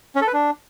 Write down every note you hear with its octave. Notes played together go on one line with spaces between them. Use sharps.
C#4
A4
B4
D4